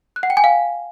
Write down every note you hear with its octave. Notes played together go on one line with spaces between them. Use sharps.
F#6
F#5
G5
G#5
F5